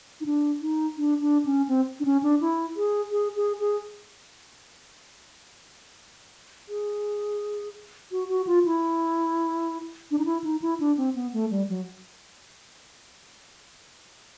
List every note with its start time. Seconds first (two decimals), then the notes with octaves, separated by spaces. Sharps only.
0.21 D#4
0.26 D4
0.61 D#4
0.98 D4
1.21 D4
1.46 C#4
1.68 C4
2.00 D4
2.05 C#4
2.23 D4
2.41 E4
2.77 G#4
3.12 G#4
3.36 G#4
3.60 G#4
6.69 G#4
8.12 F#4
8.29 F#4
8.47 F4
8.65 E4
10.11 D4
10.18 D#4
10.25 E4
10.44 D#4
10.62 E4
10.80 D4
10.97 C4
11.15 B3
11.33 A3
11.51 G3
11.69 F#3